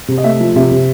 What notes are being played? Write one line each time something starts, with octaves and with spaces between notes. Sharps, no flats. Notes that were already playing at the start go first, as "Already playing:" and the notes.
C3
D#5
A3 E5
F3
C3 E5
C3